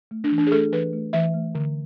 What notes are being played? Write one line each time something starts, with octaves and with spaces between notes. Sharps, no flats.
A3
D4
E3
D4
G#4
A3 A4
E3 B4
A3
E3 E5
A3
D3